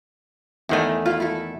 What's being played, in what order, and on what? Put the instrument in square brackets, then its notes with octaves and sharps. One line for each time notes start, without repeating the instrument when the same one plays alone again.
[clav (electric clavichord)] E2 D#3 A3 [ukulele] E4 C5 G#5
[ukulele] E4 F4
E4 A4